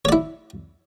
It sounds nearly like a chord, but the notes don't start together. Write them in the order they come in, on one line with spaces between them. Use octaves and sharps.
C#5 D5 E4